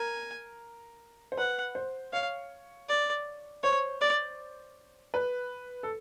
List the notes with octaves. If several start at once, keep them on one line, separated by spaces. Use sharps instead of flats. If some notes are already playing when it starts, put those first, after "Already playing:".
Already playing: A#4 G#5
C5
B4 F#5
C5
C#5 F5
D5
C5 C#5
D5
B4
A4